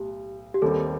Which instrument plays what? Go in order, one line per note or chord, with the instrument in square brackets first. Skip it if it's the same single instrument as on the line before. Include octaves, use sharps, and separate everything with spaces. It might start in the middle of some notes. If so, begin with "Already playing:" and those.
Already playing: [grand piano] B1 A2 [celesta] G4
[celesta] G4
[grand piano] D#2 D#3 G3 C4 [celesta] A4